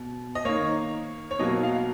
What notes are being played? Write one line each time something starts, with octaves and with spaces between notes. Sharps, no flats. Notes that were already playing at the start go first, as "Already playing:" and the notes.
Already playing: B2
D#5
D#3 A#3 C#5
C#5
B2 F#3 A#3 D#5
F5